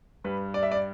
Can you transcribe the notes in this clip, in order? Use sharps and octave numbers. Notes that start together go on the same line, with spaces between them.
G2 G3 B4
D5
E5
D5